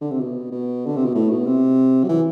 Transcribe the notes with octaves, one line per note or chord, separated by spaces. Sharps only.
D3
C3
B2
B2
D3
C3
B2
A2
B2
C3
F#3
E3